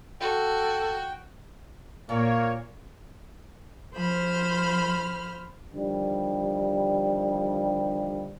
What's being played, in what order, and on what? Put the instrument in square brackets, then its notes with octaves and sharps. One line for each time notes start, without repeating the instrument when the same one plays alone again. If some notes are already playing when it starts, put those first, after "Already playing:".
[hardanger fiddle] F#4 [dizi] A4 [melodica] G5
[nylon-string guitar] A#2 [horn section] A#3 C#5
[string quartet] F3 C5 B5 F6
[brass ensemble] D3 D#3 F3 G3